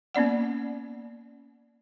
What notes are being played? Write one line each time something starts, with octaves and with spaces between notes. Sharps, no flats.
A#3 B3 C#4 D5 F#5